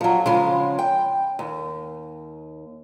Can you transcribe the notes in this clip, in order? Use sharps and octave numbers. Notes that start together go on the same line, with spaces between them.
F3 F#3
C#3 F3 G#3
G5
D#2